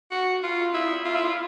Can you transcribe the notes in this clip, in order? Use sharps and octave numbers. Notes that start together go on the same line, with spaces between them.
F#4
F4
E4
F4
E4
F4